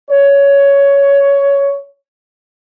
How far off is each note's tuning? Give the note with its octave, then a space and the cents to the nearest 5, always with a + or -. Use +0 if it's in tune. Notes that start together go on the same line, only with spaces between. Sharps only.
C#5 +10